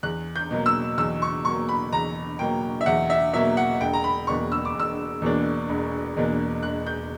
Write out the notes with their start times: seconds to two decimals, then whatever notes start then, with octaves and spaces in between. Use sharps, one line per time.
0.03 E2 F#6
0.36 G6
0.51 B2 F#3 A#3
0.66 E6
0.98 E2 E6
1.22 C#6
1.44 B2 F#3 A#3 C#6
1.69 B5
1.92 E2 A#5
2.39 B2 F#3 A#3 G5
2.81 E5
2.86 E2 F#5
3.10 E5
3.33 B2 F#3 A#3 E5
3.57 F#5
3.80 E1 G5
3.93 A#5
4.04 B5
4.27 E2 B2 A#3 D4 C#6
4.52 E6
4.65 D6
4.75 E1 E6
5.22 E2 B2 A#3 D4
5.69 E1
6.16 E2 B2 A#3 D4
6.62 E1 F#6
6.87 G6